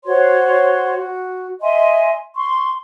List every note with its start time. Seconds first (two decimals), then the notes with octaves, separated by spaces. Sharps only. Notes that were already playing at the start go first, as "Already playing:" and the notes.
0.05 F#4 C5 C#5 C6
0.99 F#4
1.61 D#5 E5 G#5 C6
2.36 C6 C#6